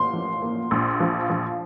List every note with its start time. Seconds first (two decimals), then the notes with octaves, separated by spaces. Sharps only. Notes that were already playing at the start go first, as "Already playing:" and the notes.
Already playing: A1 A#3 C6
0.14 F3
0.42 A#3
0.71 A#1
1.00 F3
1.30 F3